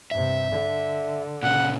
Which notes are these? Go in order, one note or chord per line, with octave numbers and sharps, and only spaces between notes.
G2 C3 E5
D3
A#2 C#3 F#5